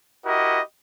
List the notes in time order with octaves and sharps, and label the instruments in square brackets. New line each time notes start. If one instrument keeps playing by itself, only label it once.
[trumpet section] E4 F#4 G4 A#4 D#5